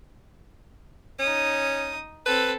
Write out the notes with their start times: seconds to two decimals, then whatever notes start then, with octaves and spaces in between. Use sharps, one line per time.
1.19 C#4 D#4 D#6
2.26 C4 A4 B4